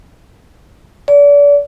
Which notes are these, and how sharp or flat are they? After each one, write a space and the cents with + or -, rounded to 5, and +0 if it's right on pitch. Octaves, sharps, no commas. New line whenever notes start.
D5 -35